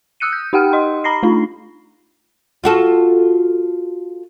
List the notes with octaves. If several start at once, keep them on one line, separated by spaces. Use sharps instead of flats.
D#6 E6 F#6 C#7 D#7
G6
D#4 G4 F#5 G5 F6
D#5 C6
A#5 B5 A#6 C7
A3 D4 D#4 F4
F4 F#4 A4